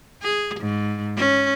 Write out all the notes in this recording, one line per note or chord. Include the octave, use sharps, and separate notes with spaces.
G#4
G#2
C#4